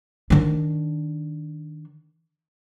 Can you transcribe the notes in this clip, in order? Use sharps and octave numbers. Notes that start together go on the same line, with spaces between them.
D#3 D4